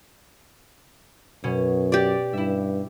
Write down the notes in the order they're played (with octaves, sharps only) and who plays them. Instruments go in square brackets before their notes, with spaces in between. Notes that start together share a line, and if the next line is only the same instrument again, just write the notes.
[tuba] F#2 [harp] B2 C#4
[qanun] G4 D5
[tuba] G2 [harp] E4 E5